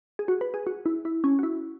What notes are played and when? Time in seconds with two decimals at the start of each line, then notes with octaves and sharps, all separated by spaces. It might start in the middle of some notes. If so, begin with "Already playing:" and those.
0.19 G#4
0.28 F#4
0.41 B4
0.54 G#4
0.67 F#4
0.86 E4
1.05 E4
1.24 C#4
1.39 F#4
1.43 E4